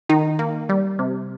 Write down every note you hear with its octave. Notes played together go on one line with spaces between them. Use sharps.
D#3 D#4
A#3
G3
C3